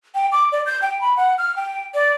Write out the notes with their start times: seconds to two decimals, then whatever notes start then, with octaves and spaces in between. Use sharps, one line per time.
0.15 G5
0.32 D6
0.52 D5
0.66 G6
0.82 G5
1.01 B5
1.17 F#5
1.38 F6
1.56 G5
1.94 D5